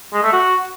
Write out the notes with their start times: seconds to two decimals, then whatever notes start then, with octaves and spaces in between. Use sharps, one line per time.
0.13 G#3
0.23 A3
0.33 F#4